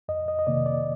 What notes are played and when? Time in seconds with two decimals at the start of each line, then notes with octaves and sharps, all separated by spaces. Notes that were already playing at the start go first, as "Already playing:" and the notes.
0.09 F2 D#5
0.28 D#5
0.39 D#5
0.47 C3 D#3 A#3 D5
0.66 D5